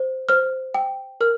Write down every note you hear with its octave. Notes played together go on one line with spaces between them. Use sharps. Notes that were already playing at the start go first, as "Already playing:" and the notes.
Already playing: C5
C5 F6
G5
A#4 F6